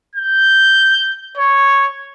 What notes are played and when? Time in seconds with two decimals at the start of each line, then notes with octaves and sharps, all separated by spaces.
0.16 G6
1.37 C#5